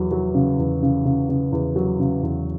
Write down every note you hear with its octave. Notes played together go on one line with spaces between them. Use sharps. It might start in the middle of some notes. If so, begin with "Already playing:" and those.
Already playing: E2 F#3
F#3
C#3
E2
C#3
C#3
C#3
E2
F#3
C#3
E2